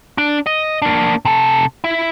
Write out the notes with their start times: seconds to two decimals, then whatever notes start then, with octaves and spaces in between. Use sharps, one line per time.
0.18 D4
0.46 D#5
0.82 A#3 D4
1.25 C3 A4
1.84 E4